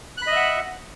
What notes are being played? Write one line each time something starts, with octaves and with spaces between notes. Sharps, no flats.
D#5 E5 F#5 B5 F#6